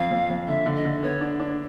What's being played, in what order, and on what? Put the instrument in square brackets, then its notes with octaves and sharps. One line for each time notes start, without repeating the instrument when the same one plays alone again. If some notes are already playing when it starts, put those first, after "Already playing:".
Already playing: [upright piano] F2 [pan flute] F5
[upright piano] F2
F2
[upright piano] D3 [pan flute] E5
[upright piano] D3
[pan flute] D#5
[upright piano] D3
[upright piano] B3 [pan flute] C#5
[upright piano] D4
D4